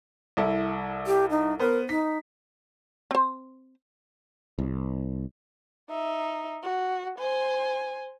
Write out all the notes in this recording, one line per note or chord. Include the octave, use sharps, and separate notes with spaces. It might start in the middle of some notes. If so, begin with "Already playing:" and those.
C2 E4 A4
G4
D#4
B3 A#4 C5
D#4 B6
C4 C5
C2
D#4 E5
F#4
C5 G#5